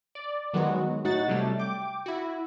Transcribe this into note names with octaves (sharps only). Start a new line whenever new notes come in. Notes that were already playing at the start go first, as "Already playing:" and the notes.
D5
D#3 F#3 G#3 B3 F#4
A2 D#4 F#4 F#5 A6
C3 F#3 G3 A3
G5 D6
E4 F#4